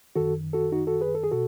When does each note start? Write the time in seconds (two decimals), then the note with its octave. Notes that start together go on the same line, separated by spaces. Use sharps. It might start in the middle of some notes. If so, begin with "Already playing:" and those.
0.16 F#2 D#3 F#4 A4
0.53 F#4 A4
0.72 D#4 F#4
0.87 F#4 A4
1.01 G#4 B4
1.15 A4
1.24 G#4
1.31 B2 F#4 A4